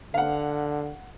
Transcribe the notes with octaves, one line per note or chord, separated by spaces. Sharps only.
D3 F5 F#5